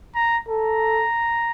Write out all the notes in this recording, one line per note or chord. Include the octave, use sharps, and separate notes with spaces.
A#5
A4 A#5